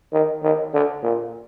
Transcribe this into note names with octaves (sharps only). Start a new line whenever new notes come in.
D#3
D#3
D3
A#2